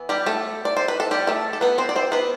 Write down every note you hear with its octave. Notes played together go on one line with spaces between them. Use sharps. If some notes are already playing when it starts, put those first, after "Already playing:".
Already playing: E3 B3
G3 G4
A3 A4
D5
C5
B4
A4
G3 G4
A3 A4
A4
B3 B4
C4 C5
D5
C4 C5
B3 B4